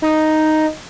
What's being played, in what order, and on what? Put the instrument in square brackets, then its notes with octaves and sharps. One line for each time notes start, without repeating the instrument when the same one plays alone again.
[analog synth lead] D#4